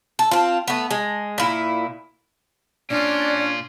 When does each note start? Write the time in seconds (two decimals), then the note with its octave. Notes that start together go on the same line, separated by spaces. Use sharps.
0.19 A4
0.31 C4 F4
0.68 A3 B3
0.91 G#3
1.38 A#2 E4
2.90 A#2 C#4 D4 F4 D5